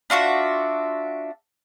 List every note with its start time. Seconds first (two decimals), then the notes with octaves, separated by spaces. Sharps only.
0.10 D4 F4 F#4 E5